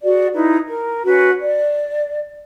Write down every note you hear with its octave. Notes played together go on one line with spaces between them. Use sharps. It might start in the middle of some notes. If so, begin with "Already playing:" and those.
F#4 G#4 D5
D#4 E4 B4
A#4
C#4 F#4 B4
D5